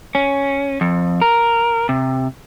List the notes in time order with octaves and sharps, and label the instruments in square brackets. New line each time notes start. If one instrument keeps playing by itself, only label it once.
[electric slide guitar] C#4
F2
A#4
C3